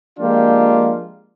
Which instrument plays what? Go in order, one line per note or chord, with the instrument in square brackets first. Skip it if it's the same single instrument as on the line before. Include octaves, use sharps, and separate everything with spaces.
[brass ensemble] F3 G#3 A#3 D4 F4 G4